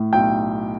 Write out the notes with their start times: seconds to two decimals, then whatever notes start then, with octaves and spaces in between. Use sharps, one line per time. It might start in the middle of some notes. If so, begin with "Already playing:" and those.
Already playing: A2 A3
0.13 B1 G5